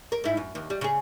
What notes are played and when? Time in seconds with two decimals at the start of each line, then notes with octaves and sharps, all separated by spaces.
0.12 A#4
0.24 G#2 E4
0.37 F#2
0.55 D#2
0.70 G3
0.81 C#3 G#4